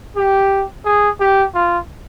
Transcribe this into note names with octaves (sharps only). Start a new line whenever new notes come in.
G4
G#4
G4
F4